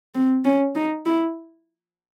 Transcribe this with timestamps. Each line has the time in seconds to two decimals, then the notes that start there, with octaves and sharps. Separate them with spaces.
0.15 C4
0.45 C#4
0.75 D#4
1.06 E4